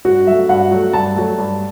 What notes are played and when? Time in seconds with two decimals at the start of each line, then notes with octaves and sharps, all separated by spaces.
0.05 G2 F#4
0.27 F#3 A3 E5
0.49 G2 F#5
0.71 F#3 A3
0.93 G2 A5
1.16 F#3 A3
1.38 G2